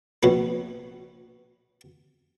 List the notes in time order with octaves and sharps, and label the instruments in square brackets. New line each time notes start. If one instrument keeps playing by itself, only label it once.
[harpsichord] A#1 B2 C#4 B4